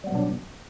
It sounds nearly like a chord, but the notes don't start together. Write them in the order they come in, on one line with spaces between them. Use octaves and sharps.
G3 B3 F#3 B2 D4